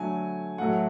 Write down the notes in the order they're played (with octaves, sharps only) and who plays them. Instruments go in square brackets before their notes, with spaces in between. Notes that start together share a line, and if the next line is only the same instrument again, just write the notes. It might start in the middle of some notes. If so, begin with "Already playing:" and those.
Already playing: [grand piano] D3 F#3 A3 G#5
A2 F#3 A3 F#5